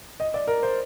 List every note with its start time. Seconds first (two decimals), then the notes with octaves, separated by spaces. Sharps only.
0.20 D#5
0.34 D5
0.47 A#4
0.63 C5